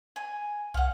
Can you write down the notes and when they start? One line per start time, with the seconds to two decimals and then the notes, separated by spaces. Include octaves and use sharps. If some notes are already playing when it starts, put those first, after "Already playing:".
0.16 G#5
0.74 C2 F5 F#5